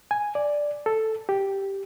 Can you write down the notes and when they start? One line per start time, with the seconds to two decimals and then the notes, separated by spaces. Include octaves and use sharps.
0.11 G#5
0.35 D5
0.86 A4
1.29 G4